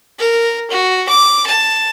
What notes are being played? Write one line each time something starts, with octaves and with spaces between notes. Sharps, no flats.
A#4
F#4
D6
A5